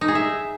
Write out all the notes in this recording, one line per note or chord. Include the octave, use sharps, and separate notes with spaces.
D#4
G#4
E5